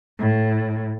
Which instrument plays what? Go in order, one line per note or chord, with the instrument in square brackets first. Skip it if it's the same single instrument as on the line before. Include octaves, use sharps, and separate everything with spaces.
[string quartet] A2